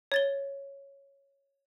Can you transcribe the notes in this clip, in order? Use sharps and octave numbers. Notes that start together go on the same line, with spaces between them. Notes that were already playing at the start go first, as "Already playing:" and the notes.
C#5 A6 G7